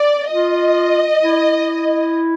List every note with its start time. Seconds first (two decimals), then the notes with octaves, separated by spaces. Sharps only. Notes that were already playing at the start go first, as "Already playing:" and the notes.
Already playing: D5
0.31 F4 D#5
1.23 E4